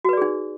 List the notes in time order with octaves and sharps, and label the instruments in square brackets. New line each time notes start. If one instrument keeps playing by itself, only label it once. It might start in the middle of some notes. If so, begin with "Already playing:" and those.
[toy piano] F#4
B4
D5
G#4
D#4